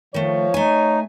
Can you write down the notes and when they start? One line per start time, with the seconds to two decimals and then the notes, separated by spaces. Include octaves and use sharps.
0.14 D#3 F3 A3 C#5
0.54 A3 D#4 G#5